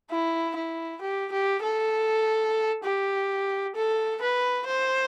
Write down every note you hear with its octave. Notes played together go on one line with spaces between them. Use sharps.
E4
E4
G4
G4
A4
G4
A4
B4
C5